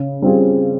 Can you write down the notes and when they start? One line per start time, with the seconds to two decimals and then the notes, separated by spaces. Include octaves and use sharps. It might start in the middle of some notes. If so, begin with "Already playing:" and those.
Already playing: C#3
0.22 G3 C4 F4 G#4